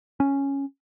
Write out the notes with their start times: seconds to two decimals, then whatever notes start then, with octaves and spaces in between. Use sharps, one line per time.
0.20 C#4